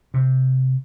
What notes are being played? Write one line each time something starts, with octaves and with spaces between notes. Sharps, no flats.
C3